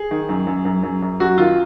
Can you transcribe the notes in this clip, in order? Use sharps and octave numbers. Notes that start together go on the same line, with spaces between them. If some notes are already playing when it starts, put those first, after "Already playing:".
Already playing: G#4
D#3
F#2
F#2
F#2
F#2
F#2
F#2 F#4
D#3 F4